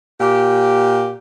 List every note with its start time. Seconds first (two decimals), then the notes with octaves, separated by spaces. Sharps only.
0.20 A#2 G4